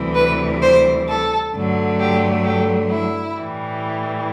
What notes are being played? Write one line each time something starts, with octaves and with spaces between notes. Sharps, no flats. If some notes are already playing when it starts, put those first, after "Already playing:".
Already playing: D2 C3 E3 G3
B4
C5
A4
G2 D3 F#3 A3
G4
G4
E4
A2 E3 G3